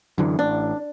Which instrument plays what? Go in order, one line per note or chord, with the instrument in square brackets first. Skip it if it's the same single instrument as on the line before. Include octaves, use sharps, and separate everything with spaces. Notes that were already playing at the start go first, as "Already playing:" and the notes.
[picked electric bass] F#2 D3 E3
[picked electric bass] A1 [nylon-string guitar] D4